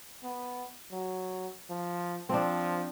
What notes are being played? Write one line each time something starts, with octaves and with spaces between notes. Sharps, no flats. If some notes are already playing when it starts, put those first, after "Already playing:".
B3
F#3
F3
F3 C4 D4